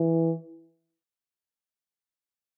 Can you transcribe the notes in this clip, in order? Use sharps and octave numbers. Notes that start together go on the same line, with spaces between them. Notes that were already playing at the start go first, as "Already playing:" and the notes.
Already playing: E3